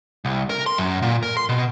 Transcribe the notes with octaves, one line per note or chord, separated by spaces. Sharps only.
C2
A#4
C6
F#2
A#2
A#4
C6
B2